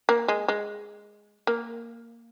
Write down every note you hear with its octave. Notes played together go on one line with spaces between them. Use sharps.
A#3
G#3
G#3
A#3